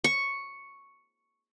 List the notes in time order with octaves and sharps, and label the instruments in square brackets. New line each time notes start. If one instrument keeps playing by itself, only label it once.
[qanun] C#6